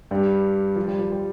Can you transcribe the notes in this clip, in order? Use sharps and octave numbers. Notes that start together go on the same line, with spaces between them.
G2 G3
F3
G3
F3
G3